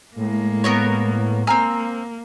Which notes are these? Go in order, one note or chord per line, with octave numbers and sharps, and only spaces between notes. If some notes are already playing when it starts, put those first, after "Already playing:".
A2 G#3 A#3
B3 A#4 C#5
A#3 C4 G#5 A#5 F6